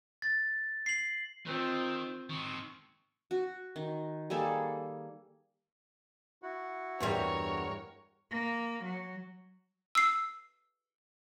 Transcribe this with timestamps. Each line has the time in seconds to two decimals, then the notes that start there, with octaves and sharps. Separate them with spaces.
0.22 A6
0.86 C7 F#7
1.46 D#3 C4 F4
2.30 D#3 C4 C#6
3.31 F#4
3.76 D#3
4.30 G3 A#3 G#4 A4
6.42 E4 F#4 F#5
7.00 E2 G2 G3 A#4 C#5
8.31 A#3
8.84 F#3
9.95 E6 C7